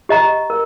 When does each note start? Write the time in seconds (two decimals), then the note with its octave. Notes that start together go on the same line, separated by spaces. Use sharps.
0.09 G4 D#5 A#5
0.50 A#4